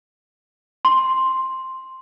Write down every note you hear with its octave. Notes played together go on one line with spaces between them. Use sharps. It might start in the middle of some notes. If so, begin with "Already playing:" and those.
C6